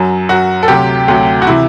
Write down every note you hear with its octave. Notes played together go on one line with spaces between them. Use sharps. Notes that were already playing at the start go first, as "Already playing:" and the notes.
Already playing: F#2 F#3
F#2 F#3 F#4
A4
D2 C3 F#3 G4
D2 C3 F#3
F#4
C3 E3 E4